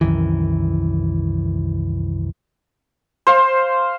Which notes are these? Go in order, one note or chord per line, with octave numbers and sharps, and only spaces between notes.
C2 F#2 D#3 E3
C5 F5